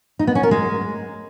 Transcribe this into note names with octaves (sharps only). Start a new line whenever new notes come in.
D#4
B3
C#4
A#4
G#3